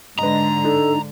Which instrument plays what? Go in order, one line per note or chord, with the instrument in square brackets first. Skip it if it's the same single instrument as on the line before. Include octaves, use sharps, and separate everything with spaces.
[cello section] G#2 D3 [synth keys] B4 D#5 [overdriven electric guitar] A#5
[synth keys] D4 D#4 [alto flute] A4